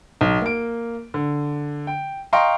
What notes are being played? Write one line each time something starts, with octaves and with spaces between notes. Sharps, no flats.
B1
A#3 D7
D3
G5
D#5 F5 G5 A#5 C6 C#6